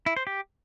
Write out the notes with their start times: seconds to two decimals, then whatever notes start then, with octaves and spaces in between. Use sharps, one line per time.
0.06 E4
0.17 C5
0.27 G4